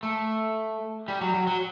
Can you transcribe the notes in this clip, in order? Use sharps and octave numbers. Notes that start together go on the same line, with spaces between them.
A3
G3
F#3
F#3
F#3